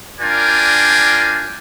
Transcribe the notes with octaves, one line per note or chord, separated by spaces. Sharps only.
D4 F4 A#4 D5 G5 G#5